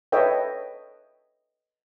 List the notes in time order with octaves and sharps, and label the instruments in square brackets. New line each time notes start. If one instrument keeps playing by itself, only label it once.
[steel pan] A4 B4 C#5 D#5 E5 G5